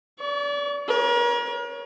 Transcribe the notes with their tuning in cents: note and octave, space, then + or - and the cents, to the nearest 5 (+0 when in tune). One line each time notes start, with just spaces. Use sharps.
D5 -30 C#6 +35
A#4 +40 C#5 +10